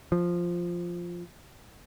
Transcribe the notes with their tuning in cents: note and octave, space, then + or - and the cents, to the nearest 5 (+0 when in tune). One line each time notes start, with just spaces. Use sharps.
F3 +0